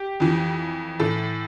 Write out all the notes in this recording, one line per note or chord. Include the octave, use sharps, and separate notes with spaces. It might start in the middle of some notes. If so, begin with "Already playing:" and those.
Already playing: G4
F2 E3
A2 E3 A4